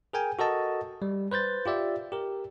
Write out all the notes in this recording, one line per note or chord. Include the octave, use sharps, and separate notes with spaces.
G#4 A#4 G5 G#5
F#4 A4 A#4 D#5 A5
G3
B4 C5 G6 A6
F4 G4 D5 E5
G4 A#4